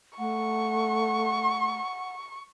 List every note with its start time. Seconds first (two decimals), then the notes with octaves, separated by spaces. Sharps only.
0.19 A3 F#5 C#6